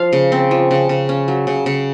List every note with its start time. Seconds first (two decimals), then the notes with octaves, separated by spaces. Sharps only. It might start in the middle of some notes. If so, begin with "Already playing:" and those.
Already playing: F3 F5
0.13 C#3
0.32 C4
0.51 F3
0.71 C#3
0.89 C#3
1.09 C#4
1.28 F#3
1.47 C#3
1.66 C#3